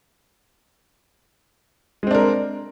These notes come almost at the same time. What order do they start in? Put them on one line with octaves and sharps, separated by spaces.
G#3 C4 D4 A#4